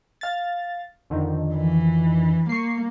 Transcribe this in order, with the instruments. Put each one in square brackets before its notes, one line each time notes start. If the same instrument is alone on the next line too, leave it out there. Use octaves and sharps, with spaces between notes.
[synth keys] F5 A6
F2 D3 D#3
[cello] E3
[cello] A#3 [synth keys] C#6 C7